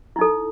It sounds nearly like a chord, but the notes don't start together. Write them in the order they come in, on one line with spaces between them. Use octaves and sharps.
E4 D#4 A4